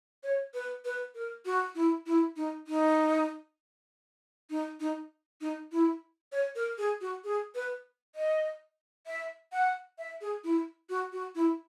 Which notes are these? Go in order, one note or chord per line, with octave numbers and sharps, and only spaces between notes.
C#5
B4
B4
A#4
F#4
E4
E4
D#4
D#4
D#4
D#4
D#4
E4
C#5
A#4
G#4
F#4
G#4
B4
D#5
E5
F#5
E5
G#4
E4
F#4
F#4
E4